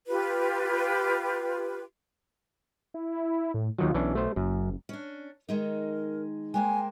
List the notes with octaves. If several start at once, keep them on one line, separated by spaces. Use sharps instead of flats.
F4 G4 B4
E4
A2
D#2 D#3 F#3 F4
B1 E3 C#4 D4
A3 C5
F#1 F#2
C#4 D4
D#3 G#3 D#4 A#4
G#3 A#3 C5 G5 G#5